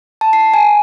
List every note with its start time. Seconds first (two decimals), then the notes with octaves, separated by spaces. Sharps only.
0.21 A5
0.33 C7
0.54 G#5